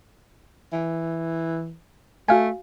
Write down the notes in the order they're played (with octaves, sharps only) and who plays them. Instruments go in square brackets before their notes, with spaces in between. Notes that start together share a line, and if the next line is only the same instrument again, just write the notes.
[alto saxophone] E3
[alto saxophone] A3 [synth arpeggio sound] F#4 F5 G#5